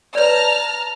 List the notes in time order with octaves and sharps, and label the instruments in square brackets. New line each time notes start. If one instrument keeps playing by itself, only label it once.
[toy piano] B4 C#5 D5 [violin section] A5 A#5 F6